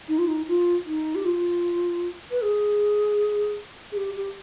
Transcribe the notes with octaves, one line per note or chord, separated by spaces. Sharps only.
D#4
F4
D#4
F4
D#4
G4
F4
B4
G#4
G#4
G4
G4